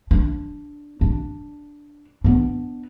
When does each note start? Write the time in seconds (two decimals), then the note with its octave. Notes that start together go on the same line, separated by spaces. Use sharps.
0.11 D4
1.01 D4
2.24 B3 D4